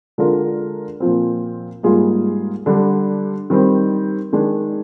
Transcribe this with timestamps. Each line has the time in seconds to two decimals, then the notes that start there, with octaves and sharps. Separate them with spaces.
0.18 D3 G#3 D4 F4 A#4
1.00 A#2 F3 C4
1.83 G#2 G3 A#3 F4 G#4
2.66 D3 G3 D4
3.50 D#3 G3 C4
4.33 D#3 G#3 D4